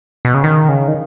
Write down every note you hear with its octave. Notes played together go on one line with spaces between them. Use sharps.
B2
C#3
D#3
C#3
D#3